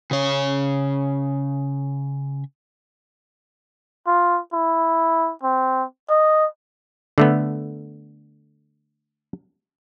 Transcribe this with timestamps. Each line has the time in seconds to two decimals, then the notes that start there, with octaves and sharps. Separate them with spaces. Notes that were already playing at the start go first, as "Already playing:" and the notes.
0.11 C#3 C#5
4.07 F4
4.53 E4
5.43 C4
6.10 D#5
7.18 D3 A3 B3